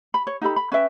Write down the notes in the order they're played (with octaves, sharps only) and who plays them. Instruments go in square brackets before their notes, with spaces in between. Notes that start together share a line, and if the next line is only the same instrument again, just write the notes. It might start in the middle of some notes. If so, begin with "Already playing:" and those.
[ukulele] B5
C#5
D#4 G4 A4 B5
B5
C#4 B4 E5 G5